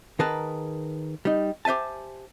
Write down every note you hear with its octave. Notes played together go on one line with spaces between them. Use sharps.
D#3 G#4 A#4 B4 A5
G3 D#4
G4 C5 E5 G#5 A5